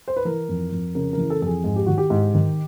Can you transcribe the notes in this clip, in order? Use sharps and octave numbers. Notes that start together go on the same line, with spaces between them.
C5
B4
E3 A#4
F2
F2
C#3 A#4
E3 A#4
A4
F2 G#4 A4
G#2 G#4
G4
D#3 F#4
G4
G#2
D#3